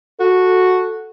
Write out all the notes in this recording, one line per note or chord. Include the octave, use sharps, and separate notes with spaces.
F#4 A4